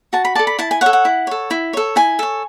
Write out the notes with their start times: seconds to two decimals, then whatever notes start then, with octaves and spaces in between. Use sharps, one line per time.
0.13 F#4 A5
0.25 B5
0.35 A4 D5 A5
0.47 B5
0.59 E4 A5
0.71 G#5
0.81 A4 C#5 F#5
0.93 F#5
1.05 E4
1.27 A4 C#5
1.51 E4
1.73 A4 C#5
1.96 E4 G#5
2.19 A4 C#5